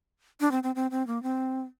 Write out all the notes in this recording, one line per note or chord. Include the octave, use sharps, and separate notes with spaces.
D4
C4
C4
C4
C4
A#3
C4